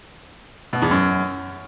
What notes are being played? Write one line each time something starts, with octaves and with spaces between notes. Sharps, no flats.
B2
E2
F#2